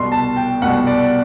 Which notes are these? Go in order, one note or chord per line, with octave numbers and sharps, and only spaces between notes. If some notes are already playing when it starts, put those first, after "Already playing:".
Already playing: C2 B2 C6
A5
G5
C2 B2 F#5
D5